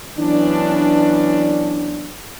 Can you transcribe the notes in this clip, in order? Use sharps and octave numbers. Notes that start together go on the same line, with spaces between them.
E3 F#3 B3 C#4 D4